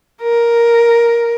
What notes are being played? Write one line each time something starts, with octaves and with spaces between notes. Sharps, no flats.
A#4